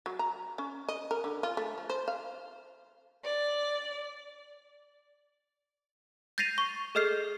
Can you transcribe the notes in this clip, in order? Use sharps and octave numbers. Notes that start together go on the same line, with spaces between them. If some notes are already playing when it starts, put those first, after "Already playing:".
F#3
A#5
C#4
D#5
A#4
D3
F4
A3
F3
C5
F5
D5
G6 A6 A#6 C7 D#7 F7
C#6
G#4 A4 D#5 F6 G6 C7